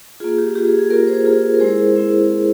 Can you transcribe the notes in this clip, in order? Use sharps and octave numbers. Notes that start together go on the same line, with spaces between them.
A#3 F4 G#4
G4
A#3 F4 G4
G#4
G#4
A#3 F4 G4 A#4
G#4 C5
A#3 F4 G#4
A#4
G#3 C4 E4 G#4 C5
G#3 C4 E4